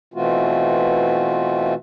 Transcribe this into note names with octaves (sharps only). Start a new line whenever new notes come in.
B2 E3 A3 C4 F4 F#4